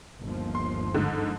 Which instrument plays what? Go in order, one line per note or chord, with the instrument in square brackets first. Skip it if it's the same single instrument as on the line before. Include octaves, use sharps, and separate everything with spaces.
[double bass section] G1 D#2 F3
[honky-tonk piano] C6
G#2 D3